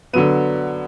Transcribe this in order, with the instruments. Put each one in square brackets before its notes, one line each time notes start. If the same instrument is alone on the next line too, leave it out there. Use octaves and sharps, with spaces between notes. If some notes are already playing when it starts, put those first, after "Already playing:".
[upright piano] D3 F#3 B3 D#7